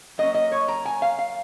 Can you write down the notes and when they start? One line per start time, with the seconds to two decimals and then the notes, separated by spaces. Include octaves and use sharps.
0.18 F#3 A#3 C#4 D#5
0.34 D#5
0.52 C#5
0.68 A#5
0.85 G#5
1.02 F5
1.19 F5